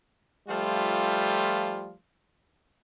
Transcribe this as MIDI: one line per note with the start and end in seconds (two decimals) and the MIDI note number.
0.48 1.95 53
0.48 1.95 55
0.48 1.95 57
0.48 1.95 65